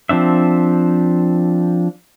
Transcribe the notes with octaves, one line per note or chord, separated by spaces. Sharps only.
F3 C4 D4 E5